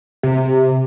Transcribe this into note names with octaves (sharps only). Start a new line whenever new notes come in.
C3